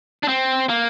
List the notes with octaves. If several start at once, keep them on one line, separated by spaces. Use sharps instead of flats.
D4
C4
A#3